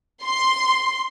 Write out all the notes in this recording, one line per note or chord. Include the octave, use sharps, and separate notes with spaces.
C6